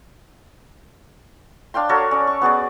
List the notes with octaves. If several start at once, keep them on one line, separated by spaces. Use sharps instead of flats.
D4 F5 G5 C6
F#4 A4 A#4 C#5
C#4 D5
C#6
B3 F#4 G#4 D5